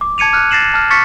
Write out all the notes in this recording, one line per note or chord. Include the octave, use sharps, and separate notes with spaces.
D6
A5 G#6 C#7 D#7 F7
D6 F6 F#6
A6 A#6 C7 E7 F#7
A5 F6
C#6 D6 F6 A6 B6 C#7